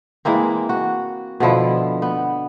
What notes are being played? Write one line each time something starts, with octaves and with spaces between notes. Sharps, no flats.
E3 G#3 A#3 C4
F#4
B2 D3 F3 E4
B3